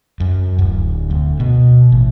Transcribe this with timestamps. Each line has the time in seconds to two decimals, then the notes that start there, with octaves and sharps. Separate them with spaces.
0.20 F#2
0.58 D1
1.10 D2
1.40 B2
1.92 A1